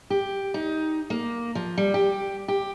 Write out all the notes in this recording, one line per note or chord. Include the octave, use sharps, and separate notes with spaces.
G4
D#4
A#3
F3
G3
G4
G4